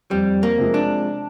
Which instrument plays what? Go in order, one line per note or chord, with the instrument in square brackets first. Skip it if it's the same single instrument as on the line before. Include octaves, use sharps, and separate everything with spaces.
[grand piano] F2 [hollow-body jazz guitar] G3
[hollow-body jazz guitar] A#3
[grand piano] C3 F3 G#3
[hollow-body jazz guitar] D4